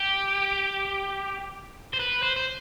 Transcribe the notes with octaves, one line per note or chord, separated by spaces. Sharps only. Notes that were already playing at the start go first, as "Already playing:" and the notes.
Already playing: G4
C5
B4
C5
C5